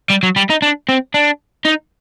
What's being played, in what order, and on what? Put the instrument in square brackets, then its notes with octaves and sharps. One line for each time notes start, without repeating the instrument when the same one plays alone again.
[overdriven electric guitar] G3
F#3
G3
D#4
D4
C4
D4
D#4